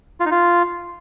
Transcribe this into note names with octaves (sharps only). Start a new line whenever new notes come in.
F4
D#4
F4